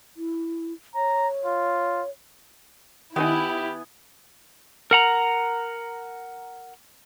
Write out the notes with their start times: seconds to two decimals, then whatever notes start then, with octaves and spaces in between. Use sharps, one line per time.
0.17 E4
0.95 C#5 A#5
1.46 F4
3.16 D#3 B3 D#4 E4 G4 G#5
4.91 A#4 F#5 A#5